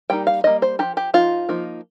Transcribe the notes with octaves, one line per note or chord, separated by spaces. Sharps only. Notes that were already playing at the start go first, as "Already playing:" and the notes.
G3 A#3 D#4 G5
F5
G3 A#3 D#4 D#5
C5
F3 D#4 G4
G4
F3 D#4 F4
F3 A#3 D#4